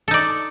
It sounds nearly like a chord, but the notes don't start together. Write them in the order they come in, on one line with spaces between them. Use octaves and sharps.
A4 D#4 D5